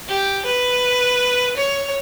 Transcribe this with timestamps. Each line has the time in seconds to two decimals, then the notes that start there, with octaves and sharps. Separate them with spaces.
0.08 G4
0.45 B4
1.57 C#5